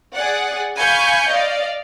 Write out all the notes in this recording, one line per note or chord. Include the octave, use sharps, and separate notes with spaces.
G#4 D5 F#5
F5 G#5 B5 C#6 G6 C#7
D5 D#5 F5